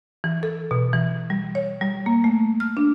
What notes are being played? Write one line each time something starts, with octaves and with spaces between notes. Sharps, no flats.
E3
A4
B2
E3
G3
C#5
G3
A#3
A3
F6
D4